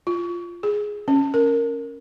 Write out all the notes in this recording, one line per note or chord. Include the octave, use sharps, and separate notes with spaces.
F4
G#4
C#4
A#4